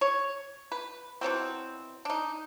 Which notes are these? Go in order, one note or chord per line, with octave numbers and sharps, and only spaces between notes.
C#5
B4
B2 E3 F#3 C4
D4 D#4